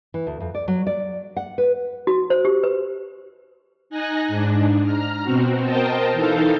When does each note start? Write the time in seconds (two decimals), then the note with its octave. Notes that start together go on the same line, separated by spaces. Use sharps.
0.14 E3
0.27 D2
0.40 F2
0.55 D5
0.68 F#3
0.87 D5
1.37 F#5
1.58 B4
2.07 F#4
2.30 C5
2.45 G4
2.64 B4
3.90 D#4 G#5 F#6 A#6
4.28 G#2 D4
4.85 A#5 F6
5.24 B2 C4 F#4
5.62 A#4 C5 D#5 G5 A5
6.13 E3 D#4 A4 F5 G6